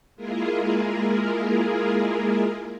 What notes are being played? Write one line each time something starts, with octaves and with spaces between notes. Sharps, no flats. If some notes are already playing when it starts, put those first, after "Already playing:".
G#3 A#3 E4 F4 G#4 A#4